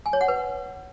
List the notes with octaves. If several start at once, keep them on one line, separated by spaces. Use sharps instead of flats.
G#5
C#5
F#5
B4